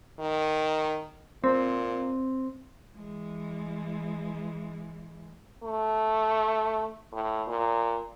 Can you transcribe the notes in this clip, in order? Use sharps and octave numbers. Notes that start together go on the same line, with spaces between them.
D#3
A#2 C4
E3 G#3
A3
A2
A#2